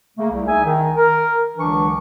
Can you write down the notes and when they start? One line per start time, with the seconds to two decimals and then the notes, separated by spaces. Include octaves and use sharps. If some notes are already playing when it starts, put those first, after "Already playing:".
0.17 C#3 A3 A#3
0.31 C2
0.47 D#4 G#4 E5 G#5
0.64 D#3
0.96 A#4
1.57 C#2 D3 E3 F#3 D4 C#6